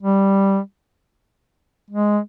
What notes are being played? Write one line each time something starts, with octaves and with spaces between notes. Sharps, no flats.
G3
G#3